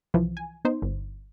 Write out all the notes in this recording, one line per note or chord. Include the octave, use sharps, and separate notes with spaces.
C2 E3 F3
G#5
B3 D#4 C5
G1